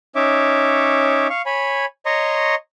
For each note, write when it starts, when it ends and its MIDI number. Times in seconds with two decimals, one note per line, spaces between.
0.16 1.27 61
0.16 1.27 63
0.16 1.27 73
0.16 1.27 76
0.16 1.27 86
1.30 1.42 77
1.30 1.42 85
1.46 1.85 73
1.46 1.85 80
1.46 1.85 83
2.06 2.55 73
2.06 2.55 75
2.06 2.55 82
2.06 2.55 84
2.06 2.55 85